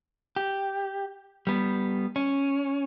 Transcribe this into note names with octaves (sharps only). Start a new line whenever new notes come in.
G4
G3 B3
C#4